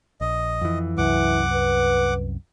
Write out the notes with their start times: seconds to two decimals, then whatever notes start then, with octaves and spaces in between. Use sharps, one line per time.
0.21 A#1 D#5
0.61 F2 E3
0.98 C2 F#2 E3 F#5 D6
1.53 B4